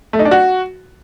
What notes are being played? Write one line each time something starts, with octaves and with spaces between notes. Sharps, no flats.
A3
D#4
D4
F#4